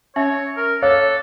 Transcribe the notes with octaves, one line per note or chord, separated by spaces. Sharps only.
C#4 C#5 E5
A#4
A4 C#5 F5 D6 F#6